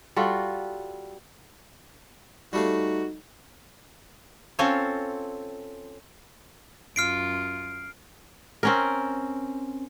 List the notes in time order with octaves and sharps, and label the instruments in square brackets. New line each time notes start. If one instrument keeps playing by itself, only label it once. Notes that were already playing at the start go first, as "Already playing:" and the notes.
[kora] G3 F4 F#4 A4
[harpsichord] G3 A3 F5 [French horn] D#4 [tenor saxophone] F#4
[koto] C4 C#4 F4 A4 C5 C#5
[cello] F#2 F4 [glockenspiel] F6 C7 D7
[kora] C4 C#4 A#4